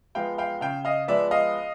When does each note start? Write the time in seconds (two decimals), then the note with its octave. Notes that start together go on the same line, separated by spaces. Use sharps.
0.15 F3 G#3 B3 F5 G5
0.38 F5 G5
0.61 C#3 F5 G5
0.85 D#5 F5
1.08 F3 G#3 B3 D5 E5
1.31 D#5 F5